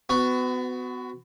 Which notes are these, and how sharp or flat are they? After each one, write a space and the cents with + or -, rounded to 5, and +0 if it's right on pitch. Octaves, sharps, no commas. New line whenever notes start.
B3 +30 F#4 +0